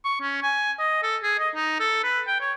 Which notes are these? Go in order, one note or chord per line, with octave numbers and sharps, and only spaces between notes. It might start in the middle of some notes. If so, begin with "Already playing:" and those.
C#6
C#4
G#5
D#5
A4
G#4
D#5
D#4
A4
B4
G5
C#5